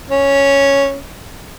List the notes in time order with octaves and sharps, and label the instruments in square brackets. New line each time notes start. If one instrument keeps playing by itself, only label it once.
[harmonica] C#4